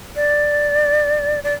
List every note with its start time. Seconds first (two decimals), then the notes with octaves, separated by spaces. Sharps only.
0.16 D5
1.44 D5